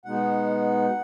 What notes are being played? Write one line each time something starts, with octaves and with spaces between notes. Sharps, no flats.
B2 G#3 B3 D#4 F#5